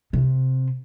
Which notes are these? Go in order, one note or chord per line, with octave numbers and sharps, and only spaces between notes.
C3